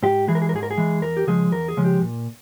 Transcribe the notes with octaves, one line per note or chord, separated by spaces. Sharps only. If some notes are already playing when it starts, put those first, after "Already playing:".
G#2 G4
E3 G#3 G#4
A#4
G#4
A#4
G#2 G#4
A#4
G#4
E3 G#3
E2 A#4
G4
C#3 F3 G#3 G#4
E2 A#4
G#4
C#3 F3 G#3
G4
A#2